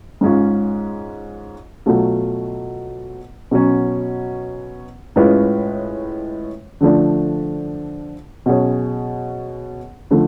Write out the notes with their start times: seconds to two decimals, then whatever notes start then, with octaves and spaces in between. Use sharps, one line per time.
0.21 G#2 G#3 C#4 F4
1.86 B2 F#3 A3 F4
3.51 B2 F#3 C#4
5.16 A2 G#3 C#4 F4 B4
6.81 D3 F3 A3 D4
8.46 B2 F#3 C#4 G#4 C#5
10.11 D3 F3 A3